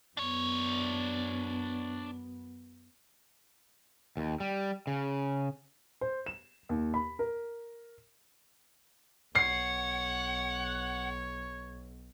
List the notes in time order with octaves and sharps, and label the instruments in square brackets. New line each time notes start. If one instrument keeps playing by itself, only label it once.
[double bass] F#2 B3 [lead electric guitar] D4 C#5
[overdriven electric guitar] D#2
G3
C#3
[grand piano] C5
E7
D#2
B5
A#4
[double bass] B1 [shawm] C#5 [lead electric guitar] F#5 [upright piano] C7